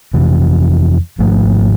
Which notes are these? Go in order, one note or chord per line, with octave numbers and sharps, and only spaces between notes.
F2 C3 E3
G#1 G#2 F3 A3